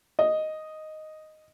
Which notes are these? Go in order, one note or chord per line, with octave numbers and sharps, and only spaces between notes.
D#5